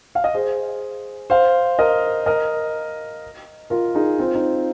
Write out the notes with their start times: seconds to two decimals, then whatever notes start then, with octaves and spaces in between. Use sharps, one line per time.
0.15 F5
0.24 D#5
0.34 G#4 C5
1.30 C5 F5
1.79 A#4 D#5
2.26 A#4 D#5
3.70 F4 A#4
3.95 D#4 G#4
4.19 C4 F4
4.35 D#4